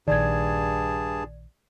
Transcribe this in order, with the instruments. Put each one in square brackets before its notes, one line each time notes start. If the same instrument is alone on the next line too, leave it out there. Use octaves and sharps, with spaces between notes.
[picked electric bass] A#1 D#3 [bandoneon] G2 G#4 A5 [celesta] D5 G#6